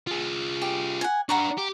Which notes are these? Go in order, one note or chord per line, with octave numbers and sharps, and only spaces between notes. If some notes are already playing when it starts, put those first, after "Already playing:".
F4 G#4
G4
F#5 G#5
D4 B4 F#5 A#5 C#6
G4